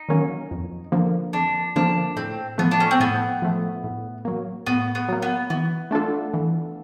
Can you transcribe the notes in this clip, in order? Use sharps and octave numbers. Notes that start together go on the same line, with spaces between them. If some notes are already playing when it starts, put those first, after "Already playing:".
Already playing: D#4
D#3 F#3 A#3 C#4
F2
D3 F3 A#3
F2 D4
D3 F3 A#3 D4
A2 C4
F3 A3 B3
D4
C#4
C4
A2 B3
F3 A3
A2
F#3 A#3
A2 B3
B3
F#3 A#3
B3
E3 B3
A3 D4 F4 A4
E3